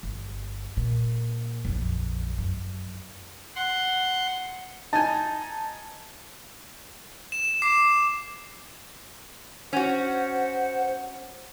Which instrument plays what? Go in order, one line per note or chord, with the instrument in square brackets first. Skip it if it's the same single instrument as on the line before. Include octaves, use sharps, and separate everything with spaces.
[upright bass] G1
A#2
A#1 F2
F#2
[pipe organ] F#5 C6
[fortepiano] D#4 G#5 [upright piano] A5
[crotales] E7
D6 C7 E7
[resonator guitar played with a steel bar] C#4 F#4 [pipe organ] C5 F#5